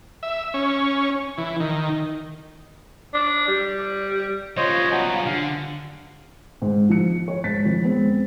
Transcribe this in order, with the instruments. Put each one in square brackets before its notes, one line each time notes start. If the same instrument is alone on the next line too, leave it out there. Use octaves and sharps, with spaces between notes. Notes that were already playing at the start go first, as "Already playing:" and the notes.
[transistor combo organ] E5
C#4
E3
D#3
[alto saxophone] D4
G3
[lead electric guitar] G3 F4 [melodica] C5 C#5 D#5
[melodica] F#3 B3 G#5
[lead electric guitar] D3 [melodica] F5
[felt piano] G#2
F3 C#7
C#5
G#2 A6 B6
F2
G#3 B3 C4